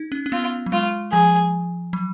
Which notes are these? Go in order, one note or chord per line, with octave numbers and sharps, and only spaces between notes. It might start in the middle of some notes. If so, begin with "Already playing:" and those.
Already playing: D#4
C#4
C#4
B3 F4
F#3
G#3 F4
F3 G#4
F#3